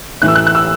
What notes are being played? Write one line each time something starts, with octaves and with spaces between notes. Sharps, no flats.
A1 A2 E3 F#6
E6
F#6
F#6
E6